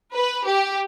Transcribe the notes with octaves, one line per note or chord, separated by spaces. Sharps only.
B4
G4